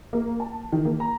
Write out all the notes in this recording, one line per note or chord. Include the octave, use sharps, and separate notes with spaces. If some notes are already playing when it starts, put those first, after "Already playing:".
A#3
A5
D#3
A#3
A#5